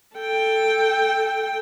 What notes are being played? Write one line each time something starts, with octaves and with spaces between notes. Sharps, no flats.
A4 G5